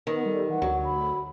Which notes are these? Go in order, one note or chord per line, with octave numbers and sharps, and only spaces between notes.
D#3 B3
G3 A4
E3 F#5
D2 F#3
B5